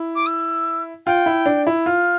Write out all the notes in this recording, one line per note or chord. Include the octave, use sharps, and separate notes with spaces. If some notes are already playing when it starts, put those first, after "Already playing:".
Already playing: E4
D6
E6
F4 G5
E4
D4
E4
F4 F6